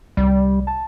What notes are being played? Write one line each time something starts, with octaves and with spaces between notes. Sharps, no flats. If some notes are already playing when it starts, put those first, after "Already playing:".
C2 G3
A5